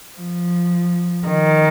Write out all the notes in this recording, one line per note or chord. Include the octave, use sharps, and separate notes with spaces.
F3
D#3